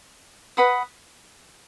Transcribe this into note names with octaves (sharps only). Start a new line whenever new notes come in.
B4 F#5 B5 D#6